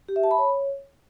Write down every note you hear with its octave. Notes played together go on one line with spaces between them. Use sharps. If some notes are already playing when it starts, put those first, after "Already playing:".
G4
E5
A5
B5
C#5